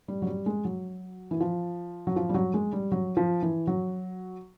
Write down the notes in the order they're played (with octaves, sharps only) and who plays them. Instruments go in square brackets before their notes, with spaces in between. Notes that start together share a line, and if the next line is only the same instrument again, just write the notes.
[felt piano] G3
F#3
G3
G#3
F#3
E3
F3
F#3
F3
G3
F#3
G#3
G3
F#3
F3
E3
F#3